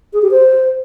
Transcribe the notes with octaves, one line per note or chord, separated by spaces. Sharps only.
G#4
G4
C5